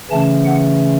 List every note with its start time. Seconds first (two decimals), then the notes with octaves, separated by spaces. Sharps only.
0.11 C#3 E3 A3 C#4 A5
0.45 F#5